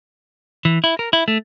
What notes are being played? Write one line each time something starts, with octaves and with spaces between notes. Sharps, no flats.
E3
E4
A#4
E4
A3